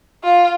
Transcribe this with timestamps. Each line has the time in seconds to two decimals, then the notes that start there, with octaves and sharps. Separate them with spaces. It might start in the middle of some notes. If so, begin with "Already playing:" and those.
0.24 F4